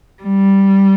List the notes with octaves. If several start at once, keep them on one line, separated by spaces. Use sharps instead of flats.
G3